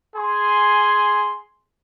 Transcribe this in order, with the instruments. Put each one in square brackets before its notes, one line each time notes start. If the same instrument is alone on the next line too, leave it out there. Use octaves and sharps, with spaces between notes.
[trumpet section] G#4 G#5 C6